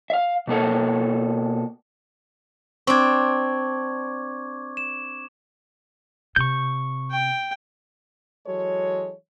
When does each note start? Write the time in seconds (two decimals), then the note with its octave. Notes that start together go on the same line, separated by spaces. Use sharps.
0.10 E5 F5
0.47 B2 A#3 A4 F#5
2.87 C4 D4 C#6 D6 G#6
4.77 E7
6.36 C3 C#6 G6
7.10 G5
8.47 E3 F#3 G#3 A4 C#5